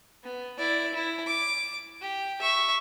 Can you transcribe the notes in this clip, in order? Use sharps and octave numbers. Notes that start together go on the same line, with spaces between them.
B3
E4 D5
E4
D6
G4
E5 C#6